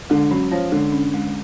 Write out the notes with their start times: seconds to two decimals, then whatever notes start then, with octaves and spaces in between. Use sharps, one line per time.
0.10 D3 G#3
0.31 F#3 C#4
0.51 F3 C#5
0.72 D3 G#3
0.92 C#4
1.14 G#3